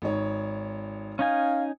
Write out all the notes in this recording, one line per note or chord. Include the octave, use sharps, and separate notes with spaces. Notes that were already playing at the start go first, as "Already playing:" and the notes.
G#1 D#4 C#5
C#4 D#4 F5 G#5